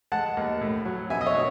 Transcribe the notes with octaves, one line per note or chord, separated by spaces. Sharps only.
G#3 F#5 A5
D#2
A2
F#3
B2 E5 G#5
D#5
C#5 E5
B2